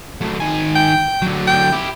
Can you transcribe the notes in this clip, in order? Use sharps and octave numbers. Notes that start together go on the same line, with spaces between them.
F#3 A3
D#3 G#5
G5
D3 F#3
G5
E4 G4